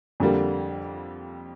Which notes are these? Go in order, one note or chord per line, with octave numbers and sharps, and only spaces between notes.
F2 D3 G3 A#3